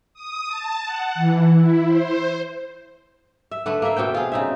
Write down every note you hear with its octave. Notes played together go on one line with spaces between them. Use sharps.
D#6
A5
F#5
E3
E4
C5
E5
D3 A3 B4
A#3 E5
B2 A3 C4 G5
F4 G#4
C#3 D#4 E5